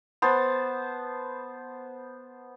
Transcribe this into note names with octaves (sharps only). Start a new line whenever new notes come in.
B3 C5 A5